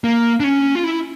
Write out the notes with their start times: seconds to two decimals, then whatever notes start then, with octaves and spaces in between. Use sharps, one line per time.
0.04 A#3
0.40 D4
0.44 C#4
0.75 F4
0.84 E4